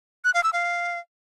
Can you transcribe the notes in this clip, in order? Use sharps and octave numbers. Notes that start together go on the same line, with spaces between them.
F#6
F5
E6
F5